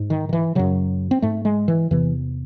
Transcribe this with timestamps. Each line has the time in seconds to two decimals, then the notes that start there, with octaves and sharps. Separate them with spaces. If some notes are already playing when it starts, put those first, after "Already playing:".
Already playing: G#2
0.10 D#3
0.29 D#3
0.33 E3
0.55 F#2 C#3 F#3
1.11 C4
1.22 G#2 A3
1.45 G#3
1.68 E3
1.91 E2 C3 E3